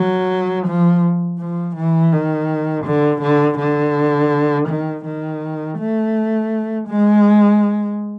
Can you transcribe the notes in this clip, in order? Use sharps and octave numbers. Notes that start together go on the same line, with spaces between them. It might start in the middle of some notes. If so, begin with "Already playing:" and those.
Already playing: F#3
F3
F3
E3
D#3
D3
D3
D3
D#3
D#3
A3
G#3